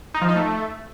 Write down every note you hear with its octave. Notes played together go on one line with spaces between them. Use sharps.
D#4
F3
D#4
A3